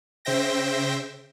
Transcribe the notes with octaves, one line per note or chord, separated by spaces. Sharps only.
C#3 C5 E5 G5 A#6